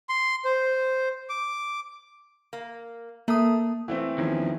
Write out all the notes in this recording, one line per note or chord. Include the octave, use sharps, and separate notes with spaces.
C6
C5
D6
A#3
A3 A#3 D#6
E3 A3 C4
E2 D#3 F3 C#4